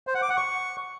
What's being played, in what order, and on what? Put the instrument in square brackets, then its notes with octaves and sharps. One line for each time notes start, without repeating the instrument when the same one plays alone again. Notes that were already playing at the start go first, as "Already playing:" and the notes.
[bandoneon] C5
F#5
D6
F#5
C#6